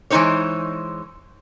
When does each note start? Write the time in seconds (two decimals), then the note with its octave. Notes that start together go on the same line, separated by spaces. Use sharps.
0.10 E3 G#3 B3 D#4 C5 C#5